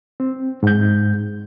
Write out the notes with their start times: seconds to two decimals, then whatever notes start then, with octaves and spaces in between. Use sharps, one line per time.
0.20 C4
0.63 G#2 G6